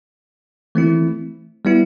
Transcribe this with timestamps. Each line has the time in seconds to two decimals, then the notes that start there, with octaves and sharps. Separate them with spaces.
0.75 E3 A3 C4 E4
1.65 G3 B3 E4